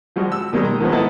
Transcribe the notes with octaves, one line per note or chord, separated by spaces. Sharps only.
F3 G3 G#3 F#4
E6
B2 D#3 G3 G#3
A#5
D#3 F3 G#3 A#3 B3
B3 D#4 E4 A4 A5